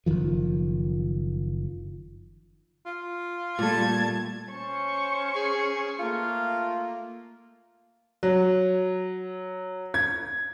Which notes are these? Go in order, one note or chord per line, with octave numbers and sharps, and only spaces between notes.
F#1 C2 D#3 F3
F4
A#2 G3 A3 A5 G#6
C#4 C5 C#6
G#4
A3 A#3 F4
F#3
G#6